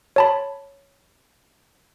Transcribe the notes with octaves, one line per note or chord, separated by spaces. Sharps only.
C#5 A5 B5